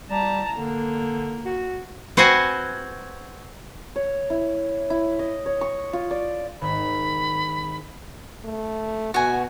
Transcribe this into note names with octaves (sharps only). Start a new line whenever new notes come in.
G3 A5 A#5
D3 A#3
F#4
C4 F#4 B4 C5 F#5 G#5
C#5
E4
E4
D#5
C#5
C#6
F4
D5
G#1 B5
A3
B2 F#4 G#5